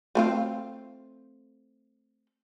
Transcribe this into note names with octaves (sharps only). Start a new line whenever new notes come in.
A3 C4 F4